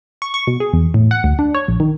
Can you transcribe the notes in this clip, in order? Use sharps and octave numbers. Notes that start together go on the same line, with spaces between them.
C#6
C#6
B2
G#4
E2
A2
F#5
D2
D4
C#5
A#1
D#3